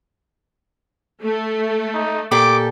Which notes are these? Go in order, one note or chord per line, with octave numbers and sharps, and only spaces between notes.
A3
D#4
A#2 G4 A4 D6